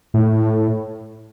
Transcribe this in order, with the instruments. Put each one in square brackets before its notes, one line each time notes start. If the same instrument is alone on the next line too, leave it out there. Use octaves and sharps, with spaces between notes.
[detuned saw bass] A2